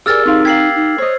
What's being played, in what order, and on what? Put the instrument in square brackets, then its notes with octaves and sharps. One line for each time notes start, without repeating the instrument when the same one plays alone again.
[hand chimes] G4 G#4 A#4 [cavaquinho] D5 G#5 [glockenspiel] E6 F6 A6
[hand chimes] C4 [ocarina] D#4 [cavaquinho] F5 C6 C#6
[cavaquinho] G4 A#4 F5 [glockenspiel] G#6 C7 F#7 [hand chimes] B6
[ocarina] D#4
[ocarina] C5 [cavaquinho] C#5 D#5